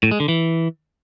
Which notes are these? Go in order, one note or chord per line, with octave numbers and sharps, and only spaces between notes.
A2
G#3
D3
E3